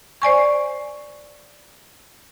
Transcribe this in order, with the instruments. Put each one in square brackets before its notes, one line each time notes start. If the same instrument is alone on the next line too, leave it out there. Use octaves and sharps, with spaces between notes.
[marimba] C5 D5 G#5 C#6